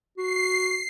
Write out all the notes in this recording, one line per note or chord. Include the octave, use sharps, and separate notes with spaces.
F#4 C7